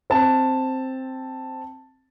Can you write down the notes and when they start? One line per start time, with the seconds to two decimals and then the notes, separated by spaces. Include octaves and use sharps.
0.10 C4 A5